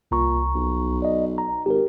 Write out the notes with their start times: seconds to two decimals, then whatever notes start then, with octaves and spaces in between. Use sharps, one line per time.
0.11 C2 A#2 A#5 C#6
0.55 B1
1.02 D5 D#5
1.38 A#5
1.66 G#1 G4 A#4